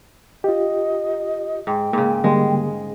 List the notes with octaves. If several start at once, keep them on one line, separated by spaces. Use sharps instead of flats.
F4 G4 D#5
G#2 G5
G#2 C#3 A#3
D3 G3 G#3 A#3
G#4